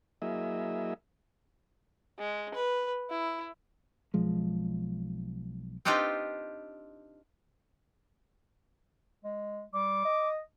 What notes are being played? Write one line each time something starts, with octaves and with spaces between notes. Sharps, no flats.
F#3 A#3 E4 G#4 D#5 E5
G#3
B4
E4
B1 F3 G#3
C4 D4 D#4 F4 G4 B4
G#3
G3 D6
D#5